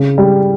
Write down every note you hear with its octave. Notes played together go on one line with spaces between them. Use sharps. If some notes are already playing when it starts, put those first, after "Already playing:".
Already playing: C#3
G3